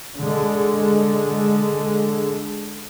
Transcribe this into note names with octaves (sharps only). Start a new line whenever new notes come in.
D3 G#3